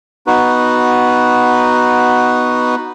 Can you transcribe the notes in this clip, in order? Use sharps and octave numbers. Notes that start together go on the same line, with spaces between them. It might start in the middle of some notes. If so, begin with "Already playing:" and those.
B3 D#4 F#4 B4